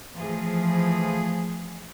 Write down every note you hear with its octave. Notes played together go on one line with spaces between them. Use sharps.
E3 F3 A3 F4 G#4